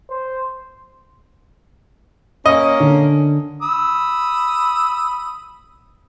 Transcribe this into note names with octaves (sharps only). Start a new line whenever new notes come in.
C5
A#3 C#4 D#5
D3
B5 D#6 E6